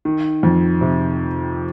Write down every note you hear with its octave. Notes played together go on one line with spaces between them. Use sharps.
D#3
F2
C3